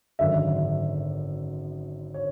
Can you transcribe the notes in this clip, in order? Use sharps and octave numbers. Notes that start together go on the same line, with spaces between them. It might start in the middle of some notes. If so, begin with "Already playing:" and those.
G#1 F#2 D3 E5
C#5